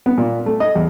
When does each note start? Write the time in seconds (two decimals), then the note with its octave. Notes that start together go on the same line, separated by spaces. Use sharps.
0.06 B3
0.18 A#2
0.46 A3
0.60 D#5
0.75 E2